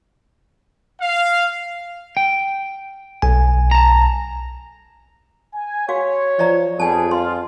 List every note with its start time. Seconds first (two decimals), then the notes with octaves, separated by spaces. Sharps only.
1.01 F5
2.17 G5
3.22 B1 G#5
3.71 A5 A#5
5.55 G#5
5.89 F#4 C#5 F5
6.39 F3 D5 E5 A#5
6.80 F2 G3 B3 G#4 G#5 A5
7.11 F4 C6